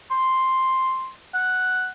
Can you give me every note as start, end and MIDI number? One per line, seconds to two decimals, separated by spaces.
0.11 1.13 84
1.35 1.89 78